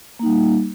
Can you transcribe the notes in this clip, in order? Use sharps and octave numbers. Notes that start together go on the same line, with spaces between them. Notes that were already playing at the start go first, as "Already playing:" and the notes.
G3 A#3 D#4